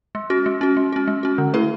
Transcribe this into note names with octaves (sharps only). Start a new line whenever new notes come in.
G#3
C#4 F#4
G#3
C#4 F#4
G#3
C#4 F#4
G#3
C#4 F#4
D3
A3 E4 G#4 B4